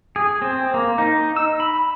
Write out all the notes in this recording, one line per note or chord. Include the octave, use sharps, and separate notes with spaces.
G#4
C4
A#3
D#4
E6
B5